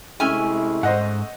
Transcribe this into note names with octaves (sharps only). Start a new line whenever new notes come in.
C3 G#3 A3 C#4 E4 G#5
G#2 C5 D#5 F#5